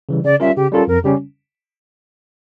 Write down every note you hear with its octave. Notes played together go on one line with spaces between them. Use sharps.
C#3 E3 G3
C#3 D5
G3 C#4 F4 A#4 E5
C#3 G4
G3 C#4 F4 A4 A#4
F2 A#4
C#3 G3 C#4 G4